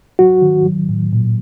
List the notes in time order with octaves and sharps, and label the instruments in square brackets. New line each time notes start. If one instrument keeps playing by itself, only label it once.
[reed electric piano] F#3 F#4
D#3
F#3
A2
A#2